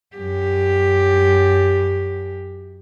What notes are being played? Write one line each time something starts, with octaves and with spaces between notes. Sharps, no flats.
F#2 G4